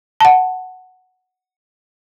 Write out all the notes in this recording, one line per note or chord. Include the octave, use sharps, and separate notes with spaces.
F#5 A5